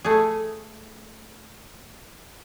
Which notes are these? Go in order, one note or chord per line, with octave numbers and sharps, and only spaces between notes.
A3 G#4